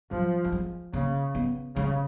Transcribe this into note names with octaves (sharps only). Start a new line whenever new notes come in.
F3 F#3
F#3
G#3
C#3 A#3
B3
C#3 G#3